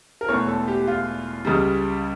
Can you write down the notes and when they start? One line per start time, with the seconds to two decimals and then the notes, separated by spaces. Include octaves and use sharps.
0.21 A#4
0.29 E1 E2 E3 A3 C#5
0.48 A4
0.68 G4
0.87 F4
1.45 C#2 C#3 G3